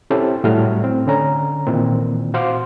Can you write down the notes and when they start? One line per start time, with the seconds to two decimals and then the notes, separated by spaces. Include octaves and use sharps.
0.10 C4 C#4 E4 G4 A4 C5
0.44 A2 F#3 G3 A3 F6
0.84 C4
1.07 D3 C#4 A#5
1.67 A#2 D#3 E3 C4
2.34 F#4 C5 F5 C6 D6